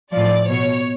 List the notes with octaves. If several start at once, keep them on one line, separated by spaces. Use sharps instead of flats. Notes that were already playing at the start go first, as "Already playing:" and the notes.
A2 F3 D5
B2 C#5